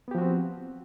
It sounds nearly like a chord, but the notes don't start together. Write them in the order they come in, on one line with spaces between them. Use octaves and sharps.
B3 G4 F3 F#4 C4